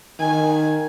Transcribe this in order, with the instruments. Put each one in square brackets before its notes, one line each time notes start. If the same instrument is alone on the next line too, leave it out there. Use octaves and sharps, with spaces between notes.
[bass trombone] D#3 [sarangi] G#5